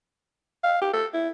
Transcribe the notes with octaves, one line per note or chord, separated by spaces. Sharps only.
F5
G4
A4
E4